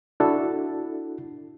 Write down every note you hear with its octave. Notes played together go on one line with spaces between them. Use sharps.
D4 E4 F#4 A4